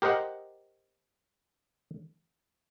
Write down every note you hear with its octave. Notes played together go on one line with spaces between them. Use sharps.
G4 A#4 C5 D#5 F#5